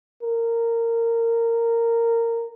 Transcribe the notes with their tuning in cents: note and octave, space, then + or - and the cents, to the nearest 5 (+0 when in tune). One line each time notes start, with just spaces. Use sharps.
A#4 -15